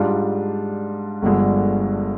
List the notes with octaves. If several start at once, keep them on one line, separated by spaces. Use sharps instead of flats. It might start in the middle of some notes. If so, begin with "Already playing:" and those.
Already playing: G#2 G3 D4 F4
G1 G2 D3 F3 G#3